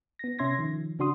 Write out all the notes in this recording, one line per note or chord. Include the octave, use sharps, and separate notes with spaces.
B3 A#6
C3 C#4 E5 C6 G#6 A#6
D#3 F3
C#3 D4 F#4 C6 D#6